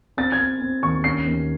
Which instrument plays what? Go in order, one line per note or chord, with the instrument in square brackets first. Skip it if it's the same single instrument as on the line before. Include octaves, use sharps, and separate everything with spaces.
[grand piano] C4 A6
G#6
C4
C4
D#2 C#6
C#4 C7
D#2